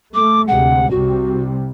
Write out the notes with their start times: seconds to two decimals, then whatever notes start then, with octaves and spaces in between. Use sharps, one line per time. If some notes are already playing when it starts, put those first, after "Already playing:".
0.14 A3 D6
0.48 D2 C3 G#3 F#5
0.91 C2 C3 G3 F#4